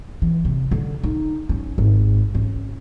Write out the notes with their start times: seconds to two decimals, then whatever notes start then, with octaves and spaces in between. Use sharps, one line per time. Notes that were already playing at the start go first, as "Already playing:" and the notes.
0.22 E3
0.45 C3
0.71 D3
1.03 D#4
1.49 C#4
1.78 G#1
2.35 C#4